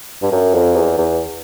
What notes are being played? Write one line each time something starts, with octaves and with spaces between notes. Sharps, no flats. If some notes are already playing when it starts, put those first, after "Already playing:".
G2
F#2
F2
E2
E2